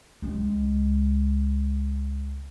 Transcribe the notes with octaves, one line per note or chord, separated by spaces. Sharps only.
C#2 G#3